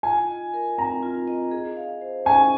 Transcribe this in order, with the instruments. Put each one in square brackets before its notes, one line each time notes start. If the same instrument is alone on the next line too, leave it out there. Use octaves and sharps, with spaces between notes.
[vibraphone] F4 [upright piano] G#5
[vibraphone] D#5
A#4
[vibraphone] C4 [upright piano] A#5
[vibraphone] F4
D#5
G#4
F5
C5
[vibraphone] C#4 [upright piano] G#5